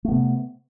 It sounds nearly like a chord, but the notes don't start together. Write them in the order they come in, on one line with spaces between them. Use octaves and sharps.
A3 B3 C3